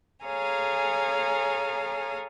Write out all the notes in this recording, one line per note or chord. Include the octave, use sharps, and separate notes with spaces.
G#4 A4 C#5 F5 G#5 A#5